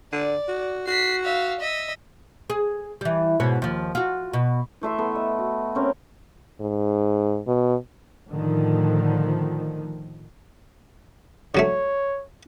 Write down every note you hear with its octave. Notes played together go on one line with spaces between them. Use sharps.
D3 D5
F#4
F#4 B6 C7
E5 F5
D#5 E5
G#4
E3 G3
G#2 B2 C#5
D#2 F3
F4 F#4
B2
E3 A3 E5 C6
B3 A4
D#5
F#4
C4 C#4 A#4
G#2
B2
A2 D3 D#3 F3
D3 F#3 A3 C#5